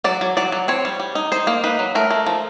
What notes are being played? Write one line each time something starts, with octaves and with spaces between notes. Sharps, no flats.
F#3 D5
F#3
F#3 D5
F#3
C4 C#5
G3
G3
D#4
D#4 C5
A#3
D#4 B4
F#3
A3 A#4
A3
F3